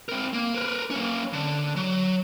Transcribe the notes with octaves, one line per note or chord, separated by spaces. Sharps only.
C4 A#4
A#3
A#4 B4
A#3 C#4
D3
F#3